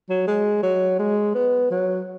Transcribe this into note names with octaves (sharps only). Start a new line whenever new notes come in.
F#3
G#3
F#3
G#3
B3
F#3